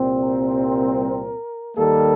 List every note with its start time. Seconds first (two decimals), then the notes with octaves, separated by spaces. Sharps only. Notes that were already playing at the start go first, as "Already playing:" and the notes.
Already playing: C2 A#2 G3 C4
0.22 A#4
1.76 D#2 D#3 G3 A#3 A4